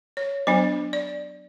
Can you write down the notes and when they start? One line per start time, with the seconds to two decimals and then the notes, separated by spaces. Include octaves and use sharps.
0.17 C#5
0.47 F#3 B3 D4 C5
0.93 D5